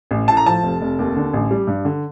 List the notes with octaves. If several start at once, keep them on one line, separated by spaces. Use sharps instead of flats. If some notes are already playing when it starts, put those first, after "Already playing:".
A1
A2 A5
A#5
F3 A5
F1
F1
D#2
D3
A1
G3
G2
D3